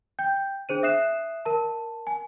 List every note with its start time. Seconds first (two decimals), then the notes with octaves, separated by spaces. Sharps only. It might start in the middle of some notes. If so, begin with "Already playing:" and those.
0.19 G5 G6
0.69 D4 G#4 C5 D#7
0.83 E5 D#6 F#6 C7 E7
1.45 A#4 A5
2.07 G#5